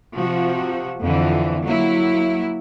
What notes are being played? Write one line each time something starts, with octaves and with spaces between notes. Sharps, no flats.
C3 F3 F#4
F2 D3 E3
F#3 A#3 E4